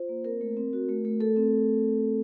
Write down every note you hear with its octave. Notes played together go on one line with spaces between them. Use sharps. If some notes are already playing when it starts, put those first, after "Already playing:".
Already playing: F4 C5
A#3
C4 A#4
A3
C4
F#4
A3
A3
A3 A4
C4